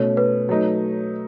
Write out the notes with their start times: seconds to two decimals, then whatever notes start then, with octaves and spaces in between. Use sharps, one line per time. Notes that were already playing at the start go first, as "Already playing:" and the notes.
Already playing: B2 A3 C#4 C#5
0.17 B4
0.49 F#3 A3 D#4